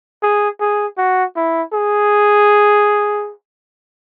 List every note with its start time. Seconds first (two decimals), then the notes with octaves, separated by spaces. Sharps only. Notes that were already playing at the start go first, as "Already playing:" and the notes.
0.22 G#4
0.60 G#4
0.98 F#4
1.36 E4
1.74 G#4